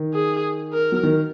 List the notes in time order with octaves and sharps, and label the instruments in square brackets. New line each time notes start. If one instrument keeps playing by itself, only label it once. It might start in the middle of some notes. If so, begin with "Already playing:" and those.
Already playing: [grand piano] D#3
[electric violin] G#4
A#4
[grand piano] F#3
D#3